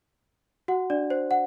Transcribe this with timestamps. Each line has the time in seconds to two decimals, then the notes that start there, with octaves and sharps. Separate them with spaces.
0.68 F#4 F#5
0.90 D4 D5
1.10 C5
1.31 F#5